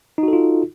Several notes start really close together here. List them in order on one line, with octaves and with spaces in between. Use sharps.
D#4 F#4 A4 F4